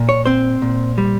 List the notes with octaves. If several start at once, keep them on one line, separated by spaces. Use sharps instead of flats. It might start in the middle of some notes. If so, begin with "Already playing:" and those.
Already playing: A#2
C#5
C4 C5
A#2
G3